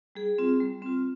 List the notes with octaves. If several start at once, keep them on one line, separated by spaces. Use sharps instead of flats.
G3 G#4
C4 F4
G3
C4 F4